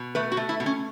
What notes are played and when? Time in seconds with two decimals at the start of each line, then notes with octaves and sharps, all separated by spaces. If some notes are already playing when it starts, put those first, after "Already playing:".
Already playing: B2
0.15 A3 B4
0.32 F#4
0.37 A3
0.49 E4
0.60 B2
0.66 C#4